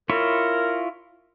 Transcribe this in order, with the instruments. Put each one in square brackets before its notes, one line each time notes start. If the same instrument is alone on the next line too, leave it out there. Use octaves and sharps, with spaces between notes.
[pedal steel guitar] E4 F4 C#5 [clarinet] A#4